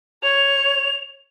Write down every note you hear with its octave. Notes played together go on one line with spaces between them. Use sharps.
C#5 F7